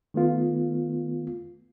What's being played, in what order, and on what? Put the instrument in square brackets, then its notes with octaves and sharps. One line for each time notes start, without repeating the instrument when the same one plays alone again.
[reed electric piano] D#3 A3 B3 F4